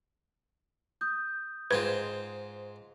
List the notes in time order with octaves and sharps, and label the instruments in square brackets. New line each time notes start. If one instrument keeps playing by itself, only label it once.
[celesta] D#6 G6
[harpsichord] G#2 C4 F4 [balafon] B4